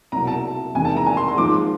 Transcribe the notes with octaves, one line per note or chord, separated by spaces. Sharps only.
C2 B2 F#3 A#5
A5
E2 C3 D#3 G#3 G#5
A5
A#5
G#5
C6
C6
G#2 F3 G#3 D6